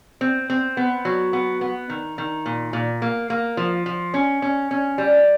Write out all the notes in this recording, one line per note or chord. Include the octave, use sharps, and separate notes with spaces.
C4
C4
B3
F#3
B3
B3
D#3
D#3
A#2
A#2
A#3
A#3
F3
F3
C#4
C#4
C#4
G3